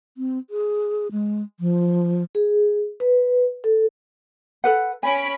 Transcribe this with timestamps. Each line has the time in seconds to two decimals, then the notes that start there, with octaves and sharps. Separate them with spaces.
0.17 C4
0.50 G#4
1.12 G#3
1.60 F3
2.35 G#4
3.00 B4
3.64 A4
4.64 A4 B4 F#5
5.03 C#4 G#5 B5 D7